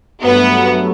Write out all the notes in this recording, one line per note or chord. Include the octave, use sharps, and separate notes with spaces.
G2 F#3 A3 B3